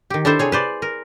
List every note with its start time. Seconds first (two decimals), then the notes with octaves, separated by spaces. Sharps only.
0.10 D#3 G4
0.25 D4 E4 A4 C5
0.39 C3 G#4 C#5
0.52 B4 C5 D5
0.82 A#4